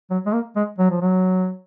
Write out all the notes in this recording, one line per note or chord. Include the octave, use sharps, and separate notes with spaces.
F#3
G#3
A#3
G#3
F#3
F3
F#3